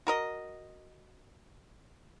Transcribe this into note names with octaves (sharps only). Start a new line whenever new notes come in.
F#4 A#4 D#5